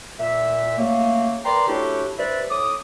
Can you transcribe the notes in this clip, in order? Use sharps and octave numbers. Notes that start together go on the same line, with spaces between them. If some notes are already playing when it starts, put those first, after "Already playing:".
A#2 E5
C#3 F#3 A3 A#3
A#4 B4 D5 G5 A#5 C6
A3 C#4 D4 E4 F#4 G4
G3 D4 B4 C5 D5 E5
A2 D6 D#6